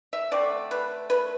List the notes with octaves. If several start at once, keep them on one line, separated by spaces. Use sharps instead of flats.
E5
D3 A3 C4 D5
B4
B4